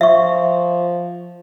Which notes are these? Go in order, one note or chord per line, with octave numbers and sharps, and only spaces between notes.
F3 E5 C#6